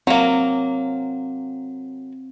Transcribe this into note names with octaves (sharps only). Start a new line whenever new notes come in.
F#3 A#3 C4